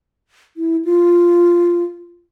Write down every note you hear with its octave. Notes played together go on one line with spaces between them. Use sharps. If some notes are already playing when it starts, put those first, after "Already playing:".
E4
F4